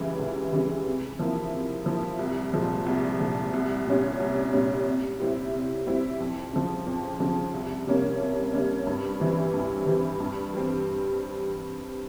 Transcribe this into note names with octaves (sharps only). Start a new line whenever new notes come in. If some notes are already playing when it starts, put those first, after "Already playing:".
Already playing: C#2 C#3 E3 G3
C#2
C#3 E3 G3
C3
F3 A#3 E4
C3
F3 A#3 E4
C2
A#2 F3 G#3
C2
A#2 F3 G#3
C2
A#2 G3 C#4
C2
A#2 G3 C#4
C3
G3 C4 E4
C3
G3 C4 E4
F2
C#3 F3
F2
C#3 F3
C2
C3 G3 A#3 C#4
C2
C3 G3 A#3 C#4
G2
E3 G3 C4
G2
E3 G3 C4
G2
G3 C4